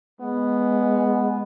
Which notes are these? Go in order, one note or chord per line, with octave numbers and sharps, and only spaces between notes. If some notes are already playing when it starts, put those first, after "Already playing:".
G#3 B3